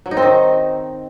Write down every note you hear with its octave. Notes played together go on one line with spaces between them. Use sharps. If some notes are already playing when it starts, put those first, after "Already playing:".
F#3
D#4
C4
D#3